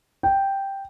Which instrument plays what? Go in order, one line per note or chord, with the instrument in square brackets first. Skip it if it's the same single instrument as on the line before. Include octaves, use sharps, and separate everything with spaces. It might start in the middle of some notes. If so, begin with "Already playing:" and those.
[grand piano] G5